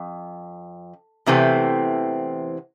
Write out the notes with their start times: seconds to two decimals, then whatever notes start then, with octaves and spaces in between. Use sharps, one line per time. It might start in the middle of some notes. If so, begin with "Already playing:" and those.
Already playing: F2
1.26 E2 C3 E3 A3 C4